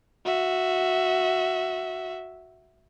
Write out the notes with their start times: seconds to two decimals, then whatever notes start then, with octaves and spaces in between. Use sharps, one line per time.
0.25 F#4 E5